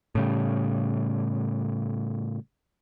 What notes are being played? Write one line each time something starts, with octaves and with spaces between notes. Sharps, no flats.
A2 C#3 G3